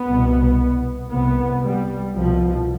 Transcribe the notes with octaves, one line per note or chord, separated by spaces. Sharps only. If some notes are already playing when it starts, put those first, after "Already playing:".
Already playing: B3
C2 B2
C2 C3 B3
G3
C2 B2 F3